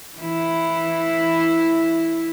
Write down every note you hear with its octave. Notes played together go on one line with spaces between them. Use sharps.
E3 E4